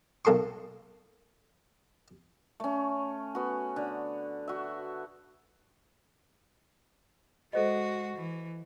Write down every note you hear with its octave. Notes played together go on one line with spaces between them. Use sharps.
B1 A#3 A4 C6 C#6
A3 C#4
B3 F#4
D3
F#4 E5
G#3 F#4 A4 C5 D#5
E3